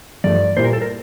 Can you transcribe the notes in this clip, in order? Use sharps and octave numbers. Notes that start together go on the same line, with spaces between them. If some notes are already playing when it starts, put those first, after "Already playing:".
G2 F3 A3 D5
A#2 G3 A#3 E4 C5
A#4
A4
A#4